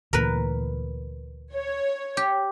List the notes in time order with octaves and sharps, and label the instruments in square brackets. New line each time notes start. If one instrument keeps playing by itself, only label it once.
[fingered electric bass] D2 A#2 E3 [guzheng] A#4 B4
[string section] C#5
[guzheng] G4